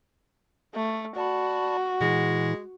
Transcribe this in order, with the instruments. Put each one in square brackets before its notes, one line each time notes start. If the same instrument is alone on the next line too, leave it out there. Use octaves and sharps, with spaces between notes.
[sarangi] A3
[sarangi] F#4 [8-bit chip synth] D5 A5 B5
[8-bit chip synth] A#2 E3 E4 [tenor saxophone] G#3